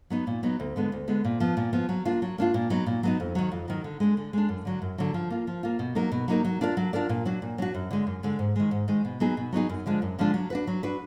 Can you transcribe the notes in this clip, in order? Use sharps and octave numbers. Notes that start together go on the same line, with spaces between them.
F#3 B3 D#4
A#2
F#3 B3 D#4
D2
D3 G#3 B3
D2
D3 G#3 B3
A#2
F3 B3
A#2
F3 B3
F#3
A#3 D4 F4
F#3
A#3 D4 F4
A#2
F#3 B3 D#4
A#2
F#3 B3 D#4
F2
D#3 F#3
F2
D#3 F#3
D3
G#3 D4
D3
G#3 D4
F#2
D3 F#3
F#2
D3 F#3
F3
A#3 F4
F3
A#3 F4
B2
F#3 A#3 D#4 A#4
B2
F#3 A#3 D#4 A#4
F#3
D4 F4 A#4 D5
F#3
D4 F4 A#4 D5
A#2
F#3 D4 F#4
A#2
F#3 D4 F#4
F#2
D3 G#3
F#2
D3 G#3
G#2
D#3 G#3
G#2
D#3 G#3
B2
F#3 B3 D#4 G#4
B2
F#3 B3 D#4 G#4
F#2
D3 F3 G#3 D4
F#2
D3 F3 G#3 D4
F#3
D4 F#4 B4
F#3
D4 F#4 B4